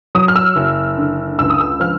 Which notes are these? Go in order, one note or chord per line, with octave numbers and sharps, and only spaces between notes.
F#3 D#6
F6
E6
F#1
D3
C#2 E6
D#6
E6
F3 F6